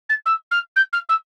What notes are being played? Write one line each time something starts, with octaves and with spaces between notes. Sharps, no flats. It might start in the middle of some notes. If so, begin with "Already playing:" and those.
A6
E6
F6
G6
F6
E6